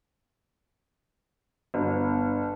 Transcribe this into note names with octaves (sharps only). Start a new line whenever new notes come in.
G1